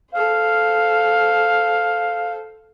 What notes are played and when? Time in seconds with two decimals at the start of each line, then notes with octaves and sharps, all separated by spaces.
0.12 A4 C5 F5